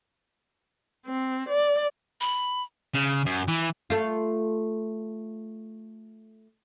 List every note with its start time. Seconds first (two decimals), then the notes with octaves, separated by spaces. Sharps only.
1.06 C4
1.49 D5
2.21 B5
2.94 C#3
3.26 F#2
3.48 E3
3.90 A3 F4